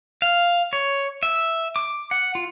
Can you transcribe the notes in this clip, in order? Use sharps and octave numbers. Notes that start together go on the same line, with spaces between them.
F5
C#5
E5
D6
F#5
F4